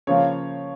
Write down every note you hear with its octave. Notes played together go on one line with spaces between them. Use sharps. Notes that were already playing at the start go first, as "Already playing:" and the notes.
C#3 F3 A#3 C#5